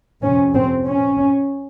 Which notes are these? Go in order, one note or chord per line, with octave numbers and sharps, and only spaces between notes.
F2 C3 C#4
C4
C#4